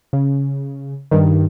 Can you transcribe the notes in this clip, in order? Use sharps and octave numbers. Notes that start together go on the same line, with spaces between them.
C#3
G2 D#3